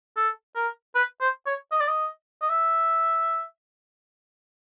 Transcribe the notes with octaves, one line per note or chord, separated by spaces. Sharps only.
A4
A#4
B4
C5
C#5
D#5
D5
D#5
D#5
E5